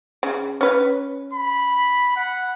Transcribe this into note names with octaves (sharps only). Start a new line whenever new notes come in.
C#3
C#4 B4
B5
F#5